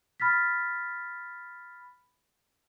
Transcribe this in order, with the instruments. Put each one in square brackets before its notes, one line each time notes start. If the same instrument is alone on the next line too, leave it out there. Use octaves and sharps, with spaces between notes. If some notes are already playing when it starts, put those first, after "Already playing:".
[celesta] B5 F6 A6 B6